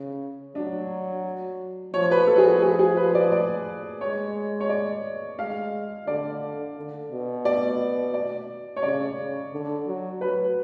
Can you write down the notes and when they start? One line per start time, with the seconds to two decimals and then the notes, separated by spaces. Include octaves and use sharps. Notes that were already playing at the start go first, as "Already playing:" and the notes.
Already playing: C#3
0.55 F#3 D4
1.94 F3 C#5
2.11 B4
2.27 F3 A4
2.38 G#4
2.45 F#4
2.62 G#4
2.79 G#4
2.97 B4
3.15 D5
3.32 D5
4.00 G#3 C#5
4.60 C#5
4.69 D5
5.38 G#3 F5
6.07 D3 D5
6.76 D3
7.11 B2
7.45 D5
8.14 D5
8.76 C#5
8.83 C#3 D5
9.17 C#3
9.52 D3
9.86 F#3
10.21 F#3 B4